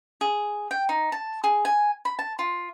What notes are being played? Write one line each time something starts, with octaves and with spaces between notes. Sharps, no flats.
G#4
G5
D#4
A5
G#4
G#5
B5
A5
F4